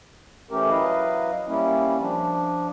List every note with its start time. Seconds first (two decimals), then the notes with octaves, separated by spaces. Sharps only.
0.51 E3 A3 C#4 G4 A#4
0.70 F#3 E4 B4 D#5 F5
1.47 G3 A#3 C#4 E4
1.99 F3 D4